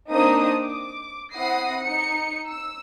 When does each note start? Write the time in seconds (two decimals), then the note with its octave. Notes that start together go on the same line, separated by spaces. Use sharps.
0.10 A#3 C4 D4 D#4 C5 D#6
0.64 D6
1.33 C4 E4 F#5 D#6 A#6 C7
1.81 D#4 C#7
2.48 E6